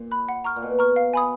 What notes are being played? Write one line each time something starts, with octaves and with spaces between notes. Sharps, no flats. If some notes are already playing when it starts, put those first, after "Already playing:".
Already playing: A#2
B5 F#6
F#5
A#5 C#6 F6
A#2
B2 F#5
A#5 C#6 F6
F5
G#5 B5 D#6